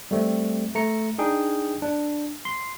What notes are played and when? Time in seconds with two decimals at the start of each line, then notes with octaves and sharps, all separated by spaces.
0.11 G3 A3 C4
0.75 A3 A#5 C#7
1.18 D4 D#4 G#4 G5
1.82 D4
2.45 C6